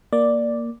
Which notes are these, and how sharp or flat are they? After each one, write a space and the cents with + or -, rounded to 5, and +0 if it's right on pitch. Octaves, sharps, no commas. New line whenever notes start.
A#3 +0 D5 +0